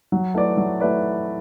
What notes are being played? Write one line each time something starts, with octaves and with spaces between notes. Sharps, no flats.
F#3
A3 E4 B4 D5
F#3
A3 E4 B4 D5